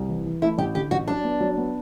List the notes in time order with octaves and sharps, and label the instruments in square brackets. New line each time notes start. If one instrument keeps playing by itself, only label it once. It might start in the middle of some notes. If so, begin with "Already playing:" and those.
Already playing: [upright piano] C2
E3
E3
[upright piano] A3 [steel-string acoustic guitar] E4
[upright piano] A1 [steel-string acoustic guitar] G4
[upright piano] D3 [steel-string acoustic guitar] G4
[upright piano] A1 [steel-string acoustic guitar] F#4
[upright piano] F#3 [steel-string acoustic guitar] D4
[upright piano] B3
F#3
B3